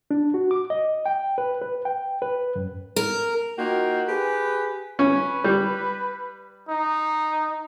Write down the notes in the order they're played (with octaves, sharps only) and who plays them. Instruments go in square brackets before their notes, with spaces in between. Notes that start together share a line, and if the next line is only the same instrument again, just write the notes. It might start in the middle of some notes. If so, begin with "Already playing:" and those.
[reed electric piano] D4
F#4
D6
D#5
G5
B4
B4
G5
B4
F#2
[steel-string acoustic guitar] A#4
[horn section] A#3 D#4 F4 F#4 G5
G4 G#4 B4
[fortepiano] C#4 [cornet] B4
[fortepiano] G3
[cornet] D#4